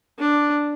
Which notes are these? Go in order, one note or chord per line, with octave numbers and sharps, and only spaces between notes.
D4